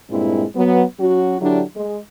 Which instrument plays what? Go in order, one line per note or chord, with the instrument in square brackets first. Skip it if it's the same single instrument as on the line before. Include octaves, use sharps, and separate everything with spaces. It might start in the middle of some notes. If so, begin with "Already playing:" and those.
[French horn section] G2 A#2 G#3 C4 E4
F#3 B3
F#3 C#4 F#4
D3 F#3 D4 E4 G4
G#3